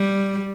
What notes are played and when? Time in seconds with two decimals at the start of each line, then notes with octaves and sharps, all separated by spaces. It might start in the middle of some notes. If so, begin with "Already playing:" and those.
Already playing: G3